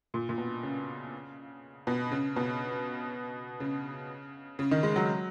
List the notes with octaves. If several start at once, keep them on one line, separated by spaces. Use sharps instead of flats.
A#2
A#2
B2
C#3
B2
C#3
B2
C#3
C#3
D#3
G#3
F#3